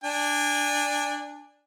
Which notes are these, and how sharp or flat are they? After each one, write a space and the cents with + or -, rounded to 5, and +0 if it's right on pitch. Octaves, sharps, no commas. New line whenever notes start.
D4 +0 G#5 -30